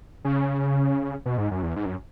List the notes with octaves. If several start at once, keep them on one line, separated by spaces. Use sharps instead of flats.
C#3
B2
G#2
F#2
E2
G#2
F#2